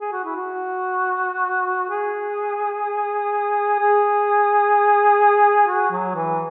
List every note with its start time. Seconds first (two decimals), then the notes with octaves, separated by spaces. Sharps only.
0.01 G#4
0.12 F#4
0.24 E4
0.36 F#4
1.90 G#4
3.79 G#4
5.67 F#4
5.91 F#3
6.15 E3